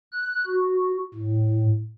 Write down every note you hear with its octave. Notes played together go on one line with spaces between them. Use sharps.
F#6
F#4
A2